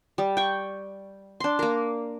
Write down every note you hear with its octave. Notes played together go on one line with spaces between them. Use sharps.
G3
G5 C#6
D4 C6
A#3 A#4